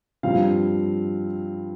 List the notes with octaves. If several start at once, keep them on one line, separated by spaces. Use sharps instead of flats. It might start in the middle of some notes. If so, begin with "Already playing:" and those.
G2 F3 C4 F5